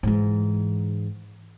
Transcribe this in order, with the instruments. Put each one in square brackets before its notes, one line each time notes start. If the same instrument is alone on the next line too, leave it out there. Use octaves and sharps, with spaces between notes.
[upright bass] G#2 E3